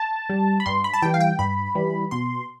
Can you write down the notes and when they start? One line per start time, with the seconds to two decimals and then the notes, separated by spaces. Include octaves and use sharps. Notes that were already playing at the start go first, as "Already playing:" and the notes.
Already playing: A5
0.29 G3
0.60 B5
0.66 G2 C6
0.84 B5
0.94 A5
1.02 E3 G3 G5
1.14 F5
1.20 G5
1.39 G2 B5
1.75 E3 G3
2.11 B2 C6